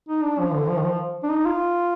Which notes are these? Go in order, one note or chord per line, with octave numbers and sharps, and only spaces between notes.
D#4
D4
F3
D3
F3
D#3
F3
D4
D#4
F4